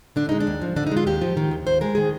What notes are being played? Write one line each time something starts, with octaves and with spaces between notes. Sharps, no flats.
D3 D4
G#3 D#4
D4
D#2
F3
D3 D4
D#4
G#3
F4
D#2 G4
F3
D#3
D#2
D#2 C5
G#3 A#4
D#3 G#4